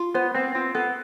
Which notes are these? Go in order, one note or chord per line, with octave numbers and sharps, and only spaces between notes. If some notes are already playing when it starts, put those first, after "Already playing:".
Already playing: F4
B3 C5
B3 C4
C4 F4
B3 A4